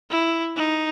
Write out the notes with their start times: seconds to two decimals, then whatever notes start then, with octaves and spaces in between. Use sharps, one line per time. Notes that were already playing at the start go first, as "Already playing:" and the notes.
0.10 E4
0.56 D#4